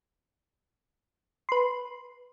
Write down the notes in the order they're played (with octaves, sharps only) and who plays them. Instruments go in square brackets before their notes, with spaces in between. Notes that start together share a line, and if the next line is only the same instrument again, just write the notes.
[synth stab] B4 C6